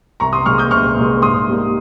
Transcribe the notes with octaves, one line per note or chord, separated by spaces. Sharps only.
C2 A#5 C#6
C6 D#6
A#2 G#3 C#6 F6
D#6 G6
C2 C#6 F6
A#2 G#3
G#2 C6 D#6
G3 A#3